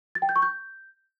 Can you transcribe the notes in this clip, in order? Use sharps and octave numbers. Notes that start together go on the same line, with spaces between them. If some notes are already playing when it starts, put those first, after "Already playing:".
A6
G5
G6
C#6
G6